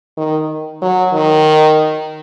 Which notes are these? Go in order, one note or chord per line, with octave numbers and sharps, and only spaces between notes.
D#3
F#3
D#3